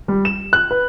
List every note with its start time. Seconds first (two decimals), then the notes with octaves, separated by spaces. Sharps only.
0.08 G3
0.25 E7
0.53 F#6
0.71 B4